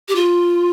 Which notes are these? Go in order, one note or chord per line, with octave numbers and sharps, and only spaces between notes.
G4
F4